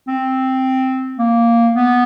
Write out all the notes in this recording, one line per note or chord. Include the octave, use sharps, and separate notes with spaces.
C4
A#3
B3